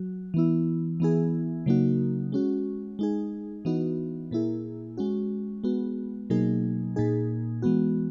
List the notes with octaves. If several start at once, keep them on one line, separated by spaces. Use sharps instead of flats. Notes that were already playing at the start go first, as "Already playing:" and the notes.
Already playing: F#3 F#4
E3 B3 E4
E3 B3 E4 G#4
C#3 F#3 A#3 D#4 F#4
G#3 C#4 F#4
G#3 D#4 G#4
E3 B3 D#4 F#4
A#2 A#3 E4 G#4
G#3 C#4 F#4
G#3 B3 F#4
B2 F#3 A#3 D#4 G#4
A#2 A#3 D#4 G#4
E3 G#3 B3 F#4